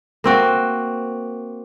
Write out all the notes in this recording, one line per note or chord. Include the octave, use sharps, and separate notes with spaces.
A#3 C4 F#4